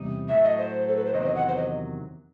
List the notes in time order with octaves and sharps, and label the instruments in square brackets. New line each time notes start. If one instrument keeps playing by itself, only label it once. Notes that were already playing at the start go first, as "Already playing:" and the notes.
Already playing: [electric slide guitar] E2 C3 G3 D#4
[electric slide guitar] A2 F#3 A3 [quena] E5
[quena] D#5
C5
A4
B4
C5
[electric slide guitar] E2 C3 D#3 F#3 [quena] D#5
[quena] C5
D#5
F#5
C5
D#5